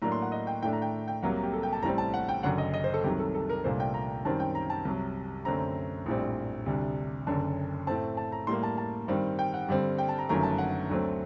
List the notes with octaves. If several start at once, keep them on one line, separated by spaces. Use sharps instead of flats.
A2 F#3 A#3 D4 A#5
C6
F#5
D#5
G5
A2 A3 D4 G5
A#5
G5
G5
C2 C3 F#3 A#3 F#5
G4
A4
G5
A5
A1 A2 G3 C4 A#5
A5
F#5
G5
F#1 F#2 D3 F#3 F#5
D#5
D#5
C5
A4
C2 C3 D#3 F#3 G4
A4
A4
A#4
C2 A#2 A3 D4 C5
G5
A#5
F#2 D#3 G3 C4 A5
G5
A#5
A5
C2 C3 F#3
F#2 D3 A3 C4 A#5
A#1 A2 G3 C4
D2 C3 G3 D4
F#1 F#2 D3 A5
A2 A3 C4 A5
A5
A#5
A2 G3 A#3 C6
A5
A5
G2 D#3 G3 C4
G5
F#5
G2 D3 G3 C4
G5
A5
A#5
G1 F#2 D#3 F#3 A3 A#5
A5
F#5
D2 D3 F#3 A3 C4